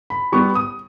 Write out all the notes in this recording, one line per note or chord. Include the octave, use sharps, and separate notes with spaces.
B5
G3 B3 C#6
D#6